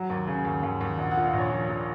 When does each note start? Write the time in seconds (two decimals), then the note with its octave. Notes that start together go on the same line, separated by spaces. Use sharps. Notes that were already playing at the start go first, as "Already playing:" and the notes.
Already playing: F#3 F#5
0.10 D#2
0.27 C#3
0.45 D#2
0.63 D#2
0.81 D#2
0.98 A#1 F#5
1.11 F#5
1.16 A#2
1.25 F5
1.33 A#1
1.38 C#5
1.51 F3
1.68 A#2